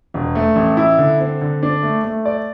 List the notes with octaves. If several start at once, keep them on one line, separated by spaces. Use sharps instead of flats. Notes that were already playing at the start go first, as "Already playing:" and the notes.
E1
A3
A1
E4
D3
C4
D3
D4
A3
A3
D5